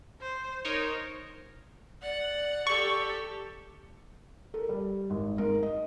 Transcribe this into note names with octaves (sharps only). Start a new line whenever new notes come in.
C5
D#4 A#4 C5 C#5
D5 F#5
G4 A4 C#6
A4 A#4
G3
G#1
G#2 A#4
D#5